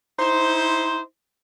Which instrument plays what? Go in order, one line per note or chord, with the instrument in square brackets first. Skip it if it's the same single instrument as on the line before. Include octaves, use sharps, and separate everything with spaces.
[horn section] D#4 E4 C5